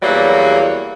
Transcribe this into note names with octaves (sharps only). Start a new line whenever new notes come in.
E2 E3 F#3 G3 A#3